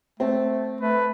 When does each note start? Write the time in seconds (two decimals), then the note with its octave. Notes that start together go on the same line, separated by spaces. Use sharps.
0.20 A3 C4
0.81 A3 B4